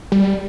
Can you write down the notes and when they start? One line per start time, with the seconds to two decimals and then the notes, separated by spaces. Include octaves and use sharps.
0.12 G3